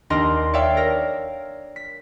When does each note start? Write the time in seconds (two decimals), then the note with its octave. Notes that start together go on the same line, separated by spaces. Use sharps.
0.10 D#2 D4 D#4 A#4 C6 A#6
0.53 C#5 D5 E5 F5 G5
0.77 A#4 A#6
1.76 B6